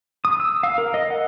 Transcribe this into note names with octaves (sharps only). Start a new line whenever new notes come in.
D#6
E6
F5
A#4
D#5
F#5